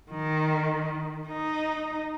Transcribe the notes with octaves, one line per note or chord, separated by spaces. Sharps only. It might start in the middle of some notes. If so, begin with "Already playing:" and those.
D#3
D#4